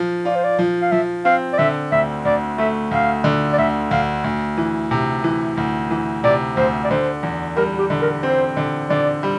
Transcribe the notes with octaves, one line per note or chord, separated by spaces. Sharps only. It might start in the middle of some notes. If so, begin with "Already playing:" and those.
Already playing: F3 F4
F4 D5
C5
D5
F3
F5
F3 E5
C4 F5
D5
D3 E5
D2 E5
D2 D5
A3 E5
D2 F5
D3
D5
D2 E5
D2 F5
D2
E3
C3
E3
D2
E3
C3 D5
D2 C5
D5
D3 C5
E2
G3 A#4
G4
D3
A#4
C4 C5
D3
D3 D5
G3